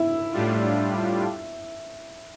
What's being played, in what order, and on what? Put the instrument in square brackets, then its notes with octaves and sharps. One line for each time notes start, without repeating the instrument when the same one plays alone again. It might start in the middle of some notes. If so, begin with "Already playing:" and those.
Already playing: [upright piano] E4
[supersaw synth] A2 G3 D4 F4